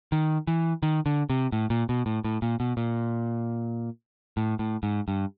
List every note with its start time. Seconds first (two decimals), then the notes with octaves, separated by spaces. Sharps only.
0.12 D#3
0.47 E3
0.83 D#3
1.06 D3
1.30 C3
1.52 A2
1.70 A#2
1.89 B2
2.06 A2
2.24 A2
2.42 A#2
2.60 B2
2.77 A#2
4.37 A2
4.59 A2
4.83 G#2
5.08 G2